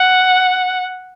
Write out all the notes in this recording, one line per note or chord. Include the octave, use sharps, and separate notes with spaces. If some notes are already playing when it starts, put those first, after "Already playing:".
Already playing: F#5